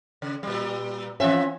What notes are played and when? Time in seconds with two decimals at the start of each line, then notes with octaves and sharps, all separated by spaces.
0.22 C#3
0.43 A#2 G3
1.20 E3 C4 C#4 F4 E5